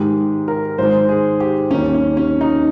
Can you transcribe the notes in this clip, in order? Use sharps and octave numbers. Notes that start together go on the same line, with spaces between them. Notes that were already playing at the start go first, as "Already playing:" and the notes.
Already playing: G#2 D#3 G#3 G4
A#4
G#2 D#3 G#3 C5
G#4
G4
D#2 D#3 G3 A#3 C#4
C#4
C#4
D#4